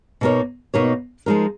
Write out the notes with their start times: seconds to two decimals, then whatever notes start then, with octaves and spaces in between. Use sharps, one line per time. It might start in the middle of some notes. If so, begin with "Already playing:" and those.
0.21 B2 A#3 D#4 A#4 C#5
0.74 B2 A#3 D#4 A#4 C#5
1.26 F3 G#3 D#4 A#4